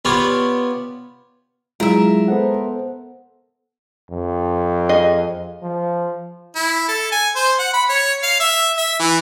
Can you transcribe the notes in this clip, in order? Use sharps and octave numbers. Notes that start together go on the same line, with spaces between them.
B3 F4 G4 C#5 D5
F#3 G#3 E4 F4 A#4 E5
B3 A4 C5 F#5
F2
G#4 D#5
F3
E4
A4
G#5
C5
F#5
B5
C#5
F5
E5
E5
E3